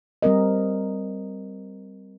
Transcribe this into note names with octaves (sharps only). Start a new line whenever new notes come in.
G3 C4 A#4 D#5